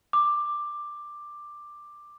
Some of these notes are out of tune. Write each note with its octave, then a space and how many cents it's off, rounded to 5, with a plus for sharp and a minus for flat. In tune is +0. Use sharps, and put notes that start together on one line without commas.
D6 +10